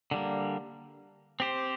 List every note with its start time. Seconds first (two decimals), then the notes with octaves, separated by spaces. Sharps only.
0.11 D3 G3 A#3
1.40 C4 G4 C5